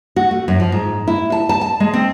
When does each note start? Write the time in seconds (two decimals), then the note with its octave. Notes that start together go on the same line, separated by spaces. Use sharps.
0.16 F#4
0.31 A3
0.48 F#2
0.60 F3
0.72 G#2
1.08 E4
1.32 A5
1.49 A5
1.61 A5
1.80 G#3
1.94 C4